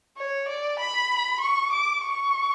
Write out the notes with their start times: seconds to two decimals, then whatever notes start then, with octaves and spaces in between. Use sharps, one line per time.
0.17 C#5
0.48 D5
0.79 B5
1.41 C#6
1.72 D6
2.04 C#6